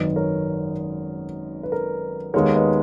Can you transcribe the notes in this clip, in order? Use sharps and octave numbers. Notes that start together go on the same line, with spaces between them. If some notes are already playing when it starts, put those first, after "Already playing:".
Already playing: G#1 F#2 D#3 B4 D#5
A#4 C#5
B4
A#4
D#2 D#3 G#3 B3 D#4 A#4 C#5
B4 D#5